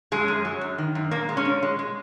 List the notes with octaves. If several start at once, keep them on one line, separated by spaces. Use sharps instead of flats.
F#2 G#3 G#4
F#2
F#3
F#2
D#3
F#2
A#2 A#3
G#3
C#4
A#2
G#3
G#3